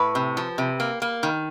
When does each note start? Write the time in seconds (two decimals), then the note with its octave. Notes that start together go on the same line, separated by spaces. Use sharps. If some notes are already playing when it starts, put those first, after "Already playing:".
Already playing: A2 B4
0.15 C3
0.37 F3
0.58 C3
0.80 A#3
1.02 A#3
1.23 D#3